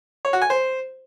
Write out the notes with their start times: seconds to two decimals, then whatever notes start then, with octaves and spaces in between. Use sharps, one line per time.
0.25 C#5
0.33 F#4
0.42 G#5
0.50 C5